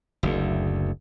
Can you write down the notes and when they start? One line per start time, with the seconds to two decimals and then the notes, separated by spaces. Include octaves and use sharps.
0.23 F#1 D2